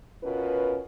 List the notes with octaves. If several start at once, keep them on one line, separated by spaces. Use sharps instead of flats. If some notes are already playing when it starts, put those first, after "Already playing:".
B2 C#4 F4 A#4 B4